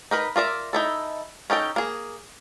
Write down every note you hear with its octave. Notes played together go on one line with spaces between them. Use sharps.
D#4 A#4 B4
F4 A#4 D5 E5
D#4 E4 A4
C#4 D#4 A4 G5
A#3 G#4